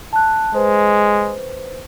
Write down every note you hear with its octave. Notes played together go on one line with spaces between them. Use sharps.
A5 F#6
G#3 B4 C5